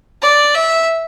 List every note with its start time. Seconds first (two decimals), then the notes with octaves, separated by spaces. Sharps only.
0.22 D5
0.54 E5